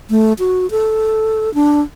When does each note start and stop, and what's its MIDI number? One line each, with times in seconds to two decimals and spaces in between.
0.10 0.33 57
0.39 0.70 66
0.71 1.53 69
1.54 1.81 62